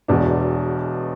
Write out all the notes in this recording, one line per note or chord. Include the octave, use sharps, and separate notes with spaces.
E1 E2 B2 D4